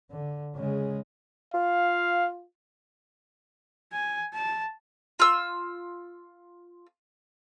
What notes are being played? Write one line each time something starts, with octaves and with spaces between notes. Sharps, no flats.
D3
C#3 G#3
F4 F5
G#5
A5
F4 E6